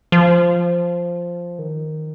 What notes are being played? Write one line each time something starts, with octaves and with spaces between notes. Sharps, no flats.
F3
D#3